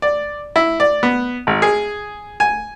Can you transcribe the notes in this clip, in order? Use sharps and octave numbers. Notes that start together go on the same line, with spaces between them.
D5
E4
D5
B3
G#1
G#4
G#5